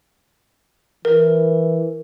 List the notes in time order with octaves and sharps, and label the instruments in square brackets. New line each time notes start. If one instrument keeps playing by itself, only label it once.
[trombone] E3 [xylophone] A#4